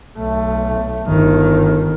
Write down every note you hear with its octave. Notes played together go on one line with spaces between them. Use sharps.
B1 A3
G1 D#3